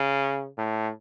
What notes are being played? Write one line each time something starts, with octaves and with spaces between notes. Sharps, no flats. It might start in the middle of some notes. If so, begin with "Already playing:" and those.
Already playing: C#3
A2